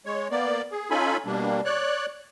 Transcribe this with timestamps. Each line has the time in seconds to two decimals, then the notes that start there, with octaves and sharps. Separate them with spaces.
0.06 G#3 C#5
0.31 A#3 B3 D5
0.71 G#4
0.90 C#4 D#4 F4 A4 G#5 B5
1.26 B2 G3 A#3 D4
1.65 C#5 D5 F#6